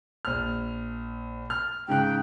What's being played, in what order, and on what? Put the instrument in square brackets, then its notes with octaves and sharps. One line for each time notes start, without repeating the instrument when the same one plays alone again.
[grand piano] A#1 F6
F6
[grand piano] G#2 C#3 F#6 [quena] G5